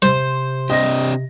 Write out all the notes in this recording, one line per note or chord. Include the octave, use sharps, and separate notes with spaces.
C3 C5
C4 D4 G4 D#5 A#6